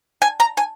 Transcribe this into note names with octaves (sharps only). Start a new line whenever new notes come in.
G#5
A#5
G#5